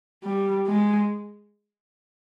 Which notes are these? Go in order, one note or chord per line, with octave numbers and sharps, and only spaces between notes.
G3
G#3